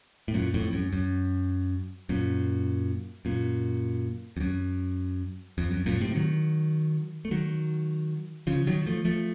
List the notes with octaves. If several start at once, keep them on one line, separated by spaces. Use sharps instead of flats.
A2
F#2 A#2
F2 A2
F#2
F#2
F#2 A#2
F#2 A#2
F2
F#2
F2
F#2
F#2 A#2
A2 C3
D#3 F#3
A3
D#3 F#3
C#3 F3
D#3 F#3
F3 A3
F3 A3